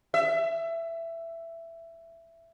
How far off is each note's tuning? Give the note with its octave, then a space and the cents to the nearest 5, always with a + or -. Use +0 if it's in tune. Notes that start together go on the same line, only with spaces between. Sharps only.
E5 +15